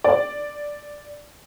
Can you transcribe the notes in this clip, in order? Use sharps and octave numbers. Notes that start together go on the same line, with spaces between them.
D5